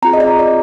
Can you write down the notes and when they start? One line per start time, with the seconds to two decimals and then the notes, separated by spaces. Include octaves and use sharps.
0.02 C4 F4 G#4 A#5
0.13 D#5
0.20 D5
0.39 D5